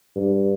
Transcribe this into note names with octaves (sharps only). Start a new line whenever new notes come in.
G2